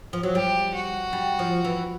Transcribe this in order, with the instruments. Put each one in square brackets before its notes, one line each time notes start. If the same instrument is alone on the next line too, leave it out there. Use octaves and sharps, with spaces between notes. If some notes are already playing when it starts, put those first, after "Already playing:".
[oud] F3
F#3
[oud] G3 [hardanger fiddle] G4
[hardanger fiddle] F#4
[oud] G3
F3
E3